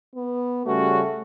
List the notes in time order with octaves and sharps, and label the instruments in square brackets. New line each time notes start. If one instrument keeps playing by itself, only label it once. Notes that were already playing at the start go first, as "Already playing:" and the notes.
[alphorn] B3
[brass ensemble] C#3 G3 C#4 F#4 [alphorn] A3